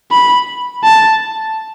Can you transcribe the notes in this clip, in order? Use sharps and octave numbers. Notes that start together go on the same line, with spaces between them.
B5
A5